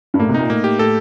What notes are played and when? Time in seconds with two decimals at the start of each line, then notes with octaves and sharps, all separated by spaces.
0.14 G2
0.19 A2 A#3
0.29 C3
0.34 A#2 D#4
0.49 A2 A#3
0.64 G4
0.79 A2 A4